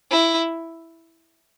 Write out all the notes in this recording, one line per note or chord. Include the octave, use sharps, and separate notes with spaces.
E4